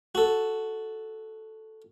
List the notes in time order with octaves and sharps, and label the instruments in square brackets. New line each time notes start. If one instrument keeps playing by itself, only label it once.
[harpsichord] F#4 A4